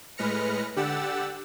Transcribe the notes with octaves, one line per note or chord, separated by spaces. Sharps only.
A2 G#3 B4 F6 A#6 C#7
D3 G4 F#5 E6 A6